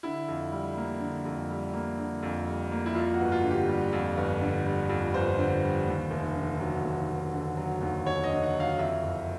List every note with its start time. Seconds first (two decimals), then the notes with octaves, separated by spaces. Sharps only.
0.03 D3 E4
0.28 F2
0.52 G3
0.77 A#3
1.00 D3
1.25 F2
1.50 G3
1.73 A#3
1.99 D3
2.23 F2
2.46 G3
2.72 A#3
2.86 E4
2.95 F2 F4
3.14 F#4
3.20 G1
3.32 F4
3.44 D3
3.51 G4
3.69 G3
3.93 F2
4.17 G1
4.41 D3
4.66 G3
4.90 F2
5.14 G1 C5
5.38 D3
5.63 G3
5.87 D#2
6.11 F1
6.35 D3
6.60 F#3
6.84 D#2
7.08 F1
7.34 D3
7.57 F#3
7.81 D#2
8.06 F1 C#5
8.23 D#5
8.30 D3
8.43 F#5
8.54 F#3
8.60 F5
8.79 F2 E5
9.03 F#1